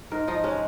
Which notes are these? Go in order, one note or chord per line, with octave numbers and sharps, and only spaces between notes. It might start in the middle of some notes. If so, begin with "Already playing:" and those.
G#2 A#4
F3 D#4
G#3 C#4